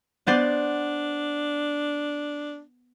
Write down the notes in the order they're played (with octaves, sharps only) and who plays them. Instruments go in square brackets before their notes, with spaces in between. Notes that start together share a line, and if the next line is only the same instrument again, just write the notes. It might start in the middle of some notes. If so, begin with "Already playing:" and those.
[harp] B3 C5 D5 [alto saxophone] D4